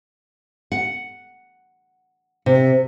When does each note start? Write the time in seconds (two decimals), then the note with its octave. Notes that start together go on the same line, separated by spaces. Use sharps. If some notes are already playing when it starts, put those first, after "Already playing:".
0.72 F#5
2.46 C3